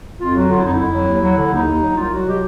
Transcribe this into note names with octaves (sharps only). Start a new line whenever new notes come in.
F2 F4
F#3 F#4
D3 F4
E4
F2 D#4
E4
F2
F#3
D#2
F#3
D3
D#2 D#4
D#2
F#3
C2 F4
F#3 F#4
B2 G4